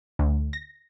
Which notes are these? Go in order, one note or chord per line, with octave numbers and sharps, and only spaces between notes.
D2
A#6